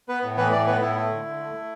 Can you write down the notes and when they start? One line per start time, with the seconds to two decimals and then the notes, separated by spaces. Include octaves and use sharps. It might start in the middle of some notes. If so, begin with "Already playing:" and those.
0.09 B3 B4
0.23 A2
0.37 E3 B4
0.52 A2 D5
0.67 B3 B4
0.81 A2 E4
0.95 A3 E4
1.10 D3
1.26 D3
1.40 A3
1.54 A3